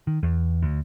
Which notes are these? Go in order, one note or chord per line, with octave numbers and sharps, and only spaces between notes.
D#3
E2
D2